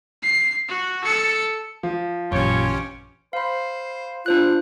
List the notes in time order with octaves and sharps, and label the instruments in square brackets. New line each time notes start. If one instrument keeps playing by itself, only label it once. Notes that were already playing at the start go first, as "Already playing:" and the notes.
[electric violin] C7
F#4
A4 C#7
[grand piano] F3
[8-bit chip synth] A1 C#4 [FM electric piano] F#2 A#2 [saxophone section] F4 G4 C#5
[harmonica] C5 [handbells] F5 B5
[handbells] D4 C5 F#6 [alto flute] F4